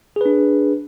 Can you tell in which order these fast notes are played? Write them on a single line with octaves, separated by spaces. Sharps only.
G#4 B4 D4